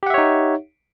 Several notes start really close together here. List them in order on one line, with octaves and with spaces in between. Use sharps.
G4 F#5 E5 C#5 D#4